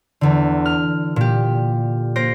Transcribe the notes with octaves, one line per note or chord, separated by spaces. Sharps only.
E2 D3
F6
A#2 G4
A#3 C5 A#6 D7